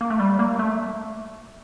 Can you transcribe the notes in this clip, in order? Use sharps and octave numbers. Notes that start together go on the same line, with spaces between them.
A#3
A3
G3
A#3
A3